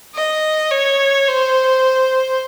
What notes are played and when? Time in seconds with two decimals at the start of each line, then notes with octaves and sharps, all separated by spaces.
0.15 D#5
0.71 C#5
1.28 C5